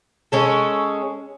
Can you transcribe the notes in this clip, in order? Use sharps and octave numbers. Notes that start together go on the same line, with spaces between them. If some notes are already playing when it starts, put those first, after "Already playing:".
G#3 C#4 A4